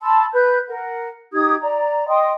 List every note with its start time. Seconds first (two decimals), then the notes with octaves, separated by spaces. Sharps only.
0.01 A5 B5 C6 E6
0.34 B4 G6
0.69 A#4 F#5
1.33 D#4 G4 D#6 G#6
1.61 D5 A#5
2.08 D#5 G5 C6 D#6